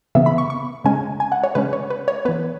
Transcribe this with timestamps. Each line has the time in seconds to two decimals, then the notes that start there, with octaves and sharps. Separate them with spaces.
0.15 C#3 E3 B3 E5
0.26 B5
0.38 C#6
0.50 C#6
0.85 C#3 G#3 C#4 G#5
1.20 G#5
1.32 F#5
1.44 C#5
1.55 C#3 G#3 C#4 B4
1.73 C#5
1.90 B4
2.08 C#5
2.25 E3 B3 B4